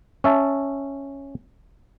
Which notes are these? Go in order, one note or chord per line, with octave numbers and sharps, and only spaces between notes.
C#4 E5 A5